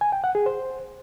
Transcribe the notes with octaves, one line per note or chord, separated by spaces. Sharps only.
G#5
G5
F#5
G#4
C5